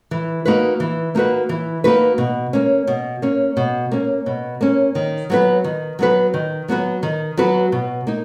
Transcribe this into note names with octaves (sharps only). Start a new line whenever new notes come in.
E3
A#3 D#4 F#4 B4
E3
A#3 D#4 F#4 B4
E3
A#3 D#4 F#4 B4
B2
A#3 C#4
B2
A#3 C#4
B2
A#3 C#4
B2
A#3 C#4
D#3
F#3 B3 F#4 B4
D#3
F#3 B3 F#4 B4
D#3
F#3 B3 F#4 B4
D#3
F#3 B3 F#4 B4
B2
A#3 D#4